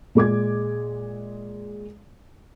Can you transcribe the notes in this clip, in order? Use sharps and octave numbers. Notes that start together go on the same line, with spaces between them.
A#2 G#3 D6 G#6